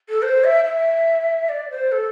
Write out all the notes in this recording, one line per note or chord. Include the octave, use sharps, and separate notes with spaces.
A4
C5
E5
E5
D5
C5
A4